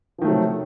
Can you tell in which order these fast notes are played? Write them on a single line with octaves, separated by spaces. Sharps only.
F3 D#3 A3 F#3 C3